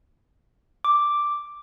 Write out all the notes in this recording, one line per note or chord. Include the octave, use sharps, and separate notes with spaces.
D6